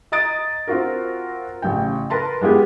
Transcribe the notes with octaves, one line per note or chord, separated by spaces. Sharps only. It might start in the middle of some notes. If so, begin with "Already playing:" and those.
D#5 A#5 D#6 A6 D7
C4 F4 F#4 A#4
A1 C#3 G5
A#4 B4 A5 C6
G#3 B3 F4 G4 G#4